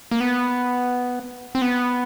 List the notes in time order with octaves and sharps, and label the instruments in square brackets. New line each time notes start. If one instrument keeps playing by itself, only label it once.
[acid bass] A#3
B3
C4
B3